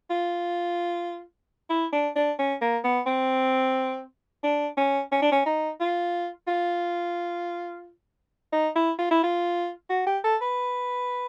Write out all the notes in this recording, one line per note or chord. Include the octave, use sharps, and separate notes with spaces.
F4
E4
D4
D4
C#4
A#3
B3
C4
D4
C#4
C#4
D4
C#4
D#4
F4
F4
D#4
E4
F4
E4
F4
F#4
G4
A4
B4